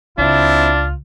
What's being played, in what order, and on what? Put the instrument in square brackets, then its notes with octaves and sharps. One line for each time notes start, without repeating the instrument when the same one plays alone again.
[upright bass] C#2 [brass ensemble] C4 E4 [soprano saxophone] D4 [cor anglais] F4